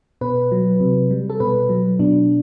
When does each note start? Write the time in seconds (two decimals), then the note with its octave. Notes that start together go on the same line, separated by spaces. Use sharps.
0.21 B2 B4
0.52 F#3
0.80 C3
1.11 G3
1.30 A4
1.40 B2 B4
1.69 F#3
1.99 B2 D4